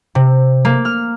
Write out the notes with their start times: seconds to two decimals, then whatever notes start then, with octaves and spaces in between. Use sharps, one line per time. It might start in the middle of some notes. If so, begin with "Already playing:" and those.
0.15 C3
0.65 A#3
0.85 F6